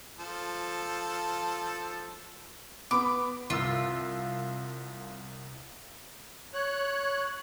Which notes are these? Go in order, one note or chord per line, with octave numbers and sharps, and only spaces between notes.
F3 A4
B3 B5 D6
C2 F4 E6
C#5 F#6